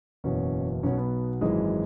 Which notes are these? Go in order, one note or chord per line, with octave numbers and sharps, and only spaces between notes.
F#1 E2 B2 C#4
B1 B2 C#4
B3
G#1 F#2 E3 G#3